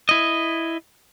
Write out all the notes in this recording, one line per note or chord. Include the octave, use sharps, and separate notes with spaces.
E4 D#5